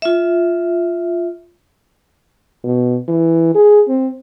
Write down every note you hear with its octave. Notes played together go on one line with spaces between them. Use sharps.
F4 E5
B2
E3
G#4
C4